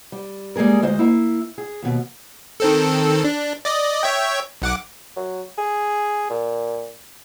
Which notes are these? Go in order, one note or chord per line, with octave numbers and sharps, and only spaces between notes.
G3
G3 G#3 A#3 G#4 A#4
D2 G#3 C5 D#5
A#3 E4
G#4
D#2 B2
D#3 C4 A4
D4
D5 D#5
C#5 E5 G5
B1 F#5 D6
F#3
G#4
A#2